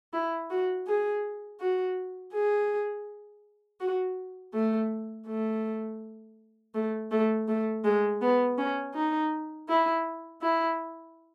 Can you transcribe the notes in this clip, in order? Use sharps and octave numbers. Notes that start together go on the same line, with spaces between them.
E4
F#4
G#4
F#4
G#4
F#4
A3
A3
A3
A3
A3
G#3
B3
C#4
D#4
E4
E4